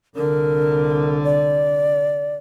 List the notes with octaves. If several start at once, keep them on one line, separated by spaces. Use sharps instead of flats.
C2 D3 A#4
D5